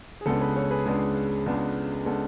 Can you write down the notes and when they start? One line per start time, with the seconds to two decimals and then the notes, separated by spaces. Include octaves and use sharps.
0.21 G#4
0.26 C#2 C#3 G#3 B3 D4 A4
0.40 G#4 B4
0.56 A4 C#5
0.71 G#4 B4
0.85 C#2 C#3 G#3 B3 D4 G#4
1.46 C#2 C#3 G#3 B3 D4
2.06 C#3 G#3 B3 D4 A4